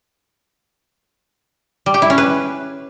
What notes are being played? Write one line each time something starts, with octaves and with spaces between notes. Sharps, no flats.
G3
G4
E4
C#4
B4